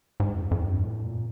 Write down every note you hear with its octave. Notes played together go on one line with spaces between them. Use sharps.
G#2
F2
F2
G2
A2
A#2